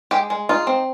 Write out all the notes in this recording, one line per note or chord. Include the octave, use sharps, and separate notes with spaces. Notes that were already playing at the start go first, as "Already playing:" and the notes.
G#3 G4
G#3
D#4 F4
C4